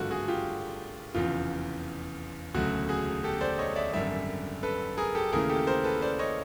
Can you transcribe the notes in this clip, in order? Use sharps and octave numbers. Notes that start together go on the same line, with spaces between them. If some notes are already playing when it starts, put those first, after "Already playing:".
Already playing: G#1 G2 D3 F3 A3 F4 F#4
F#4 G#4
F4 G4
F1 E2 C#3 F3 F4
E1 D2 C#3 F#3 A3 F#4
F#4 G#4
G4 A4
C5 D5
C#5 D#5
D5 E5
G#1 F#2 D3 G3 D5 E5
A4 B4
G#4 A#4
G4 A4
D#2 C#3 E3 A3 G#4 A#4
G4 A4
A#4 C5
A4 B4
C5 D5
C#5 D#5